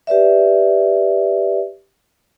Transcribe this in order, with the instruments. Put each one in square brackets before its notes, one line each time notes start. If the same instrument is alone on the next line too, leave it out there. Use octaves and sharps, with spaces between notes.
[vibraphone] G4 B4 D5 E5